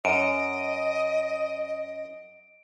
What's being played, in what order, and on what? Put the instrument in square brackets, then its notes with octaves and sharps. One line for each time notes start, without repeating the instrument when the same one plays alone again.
[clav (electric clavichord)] F#2 [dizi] D#5 [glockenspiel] D7